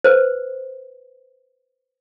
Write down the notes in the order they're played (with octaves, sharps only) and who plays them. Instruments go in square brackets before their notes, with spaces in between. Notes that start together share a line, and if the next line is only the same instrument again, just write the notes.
[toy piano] B4 C5